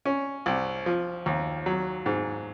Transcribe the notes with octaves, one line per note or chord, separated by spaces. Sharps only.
C#4
C2
F3
D#2
F#3
G#2